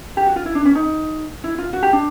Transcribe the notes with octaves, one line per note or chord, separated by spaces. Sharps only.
G4
F#4
F4
E4
D4
C#4
D#4
E4
F4
F#4
G4
D4